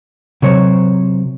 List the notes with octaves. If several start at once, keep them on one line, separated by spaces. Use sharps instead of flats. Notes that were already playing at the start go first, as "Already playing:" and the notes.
C3 F#3 A#4 C5 C#5